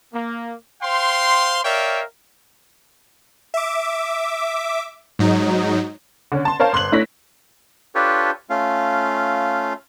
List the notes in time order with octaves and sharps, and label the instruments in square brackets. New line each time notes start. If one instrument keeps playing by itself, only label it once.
[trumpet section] A#3
C5 F5 G5 C6
A#4 C#5 D5 E5 F5 G5
[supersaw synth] E5 D6
G#2 F#3 D#4
[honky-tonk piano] D3 C#4
A5 C6
A#4 C5 C#5 F5 A5
G1 C6 F#6 F#7
A3 E4 C#5 A#6 B6
[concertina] D4 F4 G4 A4 B4 C#5
A3 C#4 F4 F5